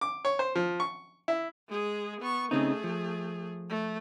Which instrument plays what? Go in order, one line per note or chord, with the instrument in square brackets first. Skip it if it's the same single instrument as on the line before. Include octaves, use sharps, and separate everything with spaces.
[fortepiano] D6
C#5
C5
F3
C#6
E4
[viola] G#3 G#4
B3 C#6
[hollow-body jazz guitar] C#3 C4 D#4 [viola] A3 G#4
[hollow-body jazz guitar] F3
[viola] A3